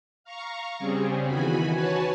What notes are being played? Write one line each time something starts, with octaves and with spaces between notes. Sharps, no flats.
F5 A#5 C#6
C#3 G3 C4 C#4 G#4
E2 D#3 E3 F#4 G#5 B5
F#4 B4 C#5 G#5 A5